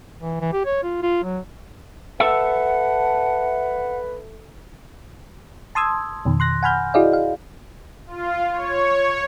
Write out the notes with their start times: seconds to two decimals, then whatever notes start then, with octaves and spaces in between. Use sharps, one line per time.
0.19 E3
0.41 E3
0.52 G4
0.65 C#5
0.83 F4
1.03 F4
1.23 F#3
2.20 A4 B4 E5 F#5
5.75 A5 C6 D#6 E6 G#6
6.25 F2 B2 D#3
6.40 C6 F#6 A#6
6.63 F#5 G#5 B5 F6 G6
6.94 E4 F#4 G#4 D5 D#5 F5
7.13 F5
8.07 F4
8.51 C#5